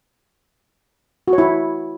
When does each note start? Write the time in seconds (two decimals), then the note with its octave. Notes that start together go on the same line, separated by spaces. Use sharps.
1.28 F#4
1.33 C#5
1.38 E4